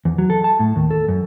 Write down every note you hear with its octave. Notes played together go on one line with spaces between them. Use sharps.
E2
F#3
A4
A5
A2
D#2
A4
F#2